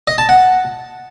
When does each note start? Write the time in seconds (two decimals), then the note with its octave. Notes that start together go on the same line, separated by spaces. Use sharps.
0.07 D#5
0.18 A5
0.29 F#5